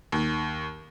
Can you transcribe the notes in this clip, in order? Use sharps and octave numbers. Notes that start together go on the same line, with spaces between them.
D#2